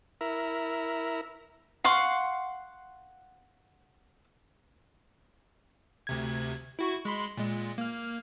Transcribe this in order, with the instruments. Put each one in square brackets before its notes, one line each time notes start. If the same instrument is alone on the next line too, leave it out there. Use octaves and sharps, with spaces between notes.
[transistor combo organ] E4 A#4
[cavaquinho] F5 F#5 C6 C#6
[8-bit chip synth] D2 C3 G#6
E4 F#4 C#6
G#3 B5 C6
A#2 G#3
A#3 F6